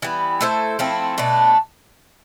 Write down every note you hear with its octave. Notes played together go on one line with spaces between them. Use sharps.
E3 G3 B3
A3 E4 A4 C5
F3 A3 C4 E4
B2 A3 D4